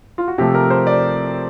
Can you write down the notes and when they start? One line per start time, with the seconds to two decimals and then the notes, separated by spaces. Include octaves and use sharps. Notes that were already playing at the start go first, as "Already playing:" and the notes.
0.18 F4
0.28 F#4
0.38 C3 F3 A3 G4
0.54 A#4
0.70 C5
0.87 D5